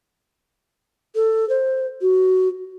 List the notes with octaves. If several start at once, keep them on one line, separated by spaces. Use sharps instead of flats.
A4
C5
F#4